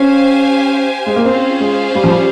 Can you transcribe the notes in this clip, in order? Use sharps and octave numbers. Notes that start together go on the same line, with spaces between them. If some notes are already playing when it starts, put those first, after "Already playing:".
Already playing: C#4 G4 C5 F5 G#5
G#3
A#3
C4 C#4 F4 G#4 C5 F5
G#3
G3
F3
G3